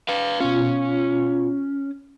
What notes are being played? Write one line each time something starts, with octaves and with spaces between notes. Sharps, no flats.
B4 F5
B2 C#4 F4